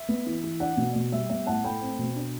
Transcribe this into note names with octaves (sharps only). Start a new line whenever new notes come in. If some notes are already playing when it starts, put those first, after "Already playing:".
Already playing: E5
B3
E3
E3
D4 D5 F#5
B2
B2
G3 E5
B3 E5
A2 F#5 A5
A3 G5 B5
C4
B2
D4